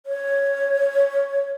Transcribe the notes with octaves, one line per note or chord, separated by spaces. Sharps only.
C#5